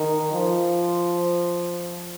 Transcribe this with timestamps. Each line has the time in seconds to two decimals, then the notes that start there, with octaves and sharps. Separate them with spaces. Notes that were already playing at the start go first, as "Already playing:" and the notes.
Already playing: D#3
0.33 F3